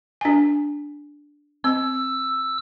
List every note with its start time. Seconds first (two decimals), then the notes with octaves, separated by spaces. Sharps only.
0.21 D4 G#5
1.64 C4 E6